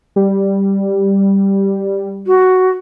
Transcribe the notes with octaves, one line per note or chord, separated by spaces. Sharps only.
G3
F#4